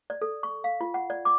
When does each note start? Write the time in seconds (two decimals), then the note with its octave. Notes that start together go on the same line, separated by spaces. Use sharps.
0.10 D5
0.22 A4
0.43 C#6
0.64 F5
0.81 F4
0.94 F#5
1.10 D5
1.25 D6